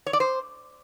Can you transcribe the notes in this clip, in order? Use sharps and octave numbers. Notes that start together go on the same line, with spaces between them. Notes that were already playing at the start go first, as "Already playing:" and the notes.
C#5
D5
C5